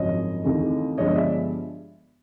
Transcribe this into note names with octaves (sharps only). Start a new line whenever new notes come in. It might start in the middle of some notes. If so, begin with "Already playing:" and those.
Already playing: G#1 F#2 C#3 F3 C#5 D#5
D#2 C#3 E3 A3 C4
G2 D3 F3 G#3 B3 C#5 D#5
D#5
D5 E5